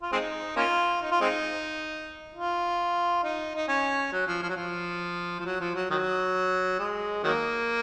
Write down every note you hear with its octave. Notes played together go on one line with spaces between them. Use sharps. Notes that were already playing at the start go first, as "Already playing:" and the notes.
F4
G#3 C4 D#4
A#3 C#4 F4
D#4
F4
G#3 C4 D#4
F4
D#4
D#4
C#4
F#3
F3
F3
F#3
F3
F3
F#3
F3
F#3
D#3 F#3
G#3
D#3 F#3 A#3